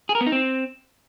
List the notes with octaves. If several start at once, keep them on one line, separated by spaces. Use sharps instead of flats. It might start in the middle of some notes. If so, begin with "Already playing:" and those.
G#4
A#4
B3
D#4
C4